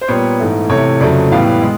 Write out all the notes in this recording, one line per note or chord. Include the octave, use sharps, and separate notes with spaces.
C5
A#2 G3 B3 C#5
G#2 E3 A3
C3 E3 A3 C#5
F2 C#3 F#3 A3 D5
A2 E3 G3 B3 F5
G#3